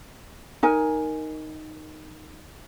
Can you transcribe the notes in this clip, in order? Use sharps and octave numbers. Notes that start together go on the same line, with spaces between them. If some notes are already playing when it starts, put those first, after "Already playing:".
D#4 A#4 G#5